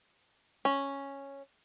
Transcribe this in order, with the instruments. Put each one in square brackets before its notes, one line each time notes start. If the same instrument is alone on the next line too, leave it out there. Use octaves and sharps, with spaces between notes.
[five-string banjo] C#4